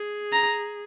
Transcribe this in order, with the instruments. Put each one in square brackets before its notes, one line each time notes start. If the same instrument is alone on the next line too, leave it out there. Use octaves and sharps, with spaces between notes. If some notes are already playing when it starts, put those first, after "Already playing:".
Already playing: [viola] G#4
[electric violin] A#5